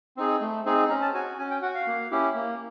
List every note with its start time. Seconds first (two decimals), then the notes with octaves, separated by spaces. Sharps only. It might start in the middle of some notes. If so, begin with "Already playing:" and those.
0.17 C4 D#4 G#4
0.41 A3
0.65 C4 D#4 G#4
0.90 C#4 A#5
1.02 A5
1.14 F#4 G#5
1.38 C#4 G#5
1.51 G5
1.62 F#4 F#5
1.75 F5
1.87 A#3
2.11 C#4 E4 G4
2.35 A#3